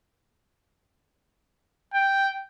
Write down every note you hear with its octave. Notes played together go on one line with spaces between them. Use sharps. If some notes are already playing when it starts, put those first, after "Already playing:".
G5